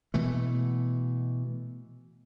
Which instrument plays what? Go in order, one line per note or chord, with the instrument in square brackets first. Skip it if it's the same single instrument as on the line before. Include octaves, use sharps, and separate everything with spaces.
[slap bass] B2 E3 A3